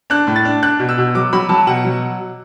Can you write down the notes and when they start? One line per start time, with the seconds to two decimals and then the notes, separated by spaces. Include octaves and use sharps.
0.10 D4 F#6
0.27 A2
0.36 A6
0.45 D4
0.62 D4 F#6
0.79 B2
0.89 E6
0.98 B2
1.15 F#3 D6
1.33 F#3 B5
1.49 F#3 A5
1.67 B2 F#5
1.85 F#3